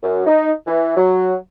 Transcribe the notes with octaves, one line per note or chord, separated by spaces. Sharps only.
F#2
D#4
E3
F#3